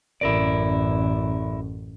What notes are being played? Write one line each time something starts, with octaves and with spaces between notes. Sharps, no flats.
A1 F#2 E4 A#4 D5